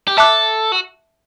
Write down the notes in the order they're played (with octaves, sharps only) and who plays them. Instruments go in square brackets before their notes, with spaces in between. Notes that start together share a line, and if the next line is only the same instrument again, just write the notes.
[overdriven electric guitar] G4
[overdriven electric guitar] A4 [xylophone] E5 A5 D6 F#6
[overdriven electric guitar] F#4